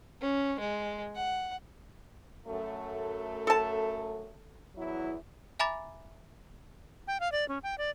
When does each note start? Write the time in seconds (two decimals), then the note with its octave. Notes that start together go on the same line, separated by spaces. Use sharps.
0.21 C#4
0.60 G#3
1.16 F#5
2.46 F#2 A3
3.47 A4 A5
4.76 E2 F#3 E4
5.59 E5 G#5 A#5 B5 D6 A6
7.08 G5
7.20 F5
7.32 D5
7.49 C#4
7.63 G5
7.78 D5